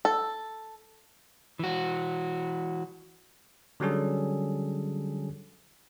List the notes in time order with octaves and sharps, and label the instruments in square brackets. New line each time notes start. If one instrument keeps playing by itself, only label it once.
[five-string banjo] A4
[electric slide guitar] E3 F#4
[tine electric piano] D3 F#3 G3 C#4 G#4 A4